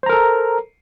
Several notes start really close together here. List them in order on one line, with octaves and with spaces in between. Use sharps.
C5 A#5 A#4 A4